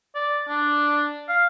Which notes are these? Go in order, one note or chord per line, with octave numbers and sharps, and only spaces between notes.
D5
D4
F5